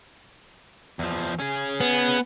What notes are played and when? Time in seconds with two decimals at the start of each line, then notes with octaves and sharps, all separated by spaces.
0.99 E2 F3
1.39 C#4 G#4
1.81 B3